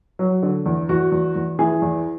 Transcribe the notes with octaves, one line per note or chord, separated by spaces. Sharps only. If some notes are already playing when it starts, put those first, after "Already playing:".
F#3
D3
E2
E2 F#4
E2
E2
E3 G#4
E2